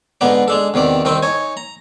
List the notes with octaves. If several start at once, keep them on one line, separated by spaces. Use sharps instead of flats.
G#2 D3 B3 D#4 D5
G#3 D4 A4
E2 C3 D#3 D5
C2 D#3 C4 D#4 D#5 G5
D#4 C#5 G#5
A#5